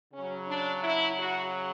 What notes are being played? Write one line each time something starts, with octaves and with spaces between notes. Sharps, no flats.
C#3 C#4
F#3
D4
E4
F#4